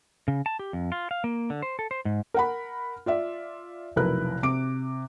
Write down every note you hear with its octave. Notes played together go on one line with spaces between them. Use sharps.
C#3
A5
G4
F2
F4
F5
A#3
D3
C5
A4
C5
G#2
A#4 F#5 B5
F4 D5 E5
F1 B1 E4 A#4 B4 F#6
C3 D6 D7